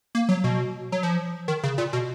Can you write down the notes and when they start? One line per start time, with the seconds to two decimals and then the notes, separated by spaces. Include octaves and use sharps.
0.15 A#3
0.29 F#3
0.44 B2
0.92 F#3
1.03 F3
1.48 D#3
1.63 C#3
1.78 A#2
1.93 B2